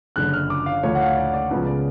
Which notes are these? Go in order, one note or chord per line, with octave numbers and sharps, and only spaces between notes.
F#1 F#2 D3 F#6
F6
D6
F5
D2 D3 F3 A3 C#5
F#5
F5
D5
D5
C#2 C#3 F3 B3
D5